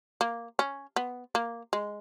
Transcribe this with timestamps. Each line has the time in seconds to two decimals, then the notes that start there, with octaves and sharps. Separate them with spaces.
0.21 A#3
0.59 C#4
0.96 B3
1.35 A#3
1.73 G#3